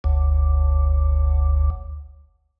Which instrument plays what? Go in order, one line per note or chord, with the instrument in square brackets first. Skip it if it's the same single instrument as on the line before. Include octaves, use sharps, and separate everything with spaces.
[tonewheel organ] F#1 D2